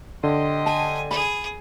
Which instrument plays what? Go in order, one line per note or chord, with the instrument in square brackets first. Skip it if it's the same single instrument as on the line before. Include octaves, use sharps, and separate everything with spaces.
[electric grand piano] D3 [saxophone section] G4 C5 D#5
[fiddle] G#5 [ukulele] A5
[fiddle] G#4 [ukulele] B5